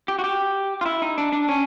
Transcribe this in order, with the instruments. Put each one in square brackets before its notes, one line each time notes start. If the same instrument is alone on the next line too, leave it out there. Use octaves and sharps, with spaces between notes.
[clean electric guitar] G4
F#4
G4
F4
E4
D#4
D4
D4
C#4